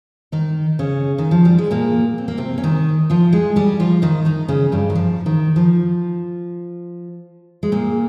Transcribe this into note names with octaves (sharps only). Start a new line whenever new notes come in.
D#3 D#4
C#3 C#4
D#3
F3
G3
G#3
A#2 A#3
C4
A#3
C3 C4
C#4
D#3 D#4
F3 F4
G#3 G#4
G3 G4
F3 F4
D#3 D#4
D#3 D#4
C#3 C#4
G2 G3
D#3
F3
D#3
F3
G#3
A#2 A#3